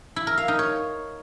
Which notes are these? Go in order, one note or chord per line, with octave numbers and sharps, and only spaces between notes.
E4
A#4
F5
D#4
C#5